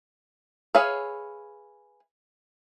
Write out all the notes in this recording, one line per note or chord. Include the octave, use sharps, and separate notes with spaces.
G#4 B4 C#5 E5 F5